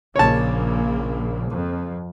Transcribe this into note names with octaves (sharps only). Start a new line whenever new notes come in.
A#1 C#3 A#3 C#5 A5
F2